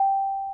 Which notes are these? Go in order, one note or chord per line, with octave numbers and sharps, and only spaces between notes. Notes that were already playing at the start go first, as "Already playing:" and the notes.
Already playing: G5